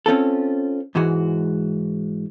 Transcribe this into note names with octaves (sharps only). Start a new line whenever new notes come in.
C4 C#4 F4 A4
G#2 E3 G#3 F#4